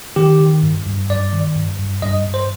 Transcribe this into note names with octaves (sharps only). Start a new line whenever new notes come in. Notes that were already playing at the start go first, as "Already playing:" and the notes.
D#3 G4
D#3
G2
G2
G2 D5
D#3
G2
G2
G2 D#5
G2
C5